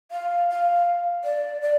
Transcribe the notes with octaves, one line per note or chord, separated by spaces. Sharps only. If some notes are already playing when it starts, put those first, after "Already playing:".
F5
F5
D5
D5